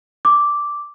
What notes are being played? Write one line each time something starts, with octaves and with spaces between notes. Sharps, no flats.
D6